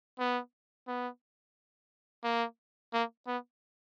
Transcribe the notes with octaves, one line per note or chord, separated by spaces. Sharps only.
B3
B3
A#3
A#3
B3